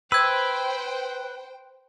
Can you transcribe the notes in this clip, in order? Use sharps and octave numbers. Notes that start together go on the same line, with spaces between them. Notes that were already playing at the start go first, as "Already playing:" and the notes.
B4 C5 G5 E6 G#6